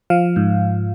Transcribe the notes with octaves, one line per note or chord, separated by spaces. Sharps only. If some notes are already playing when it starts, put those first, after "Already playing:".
F3 F5
G#2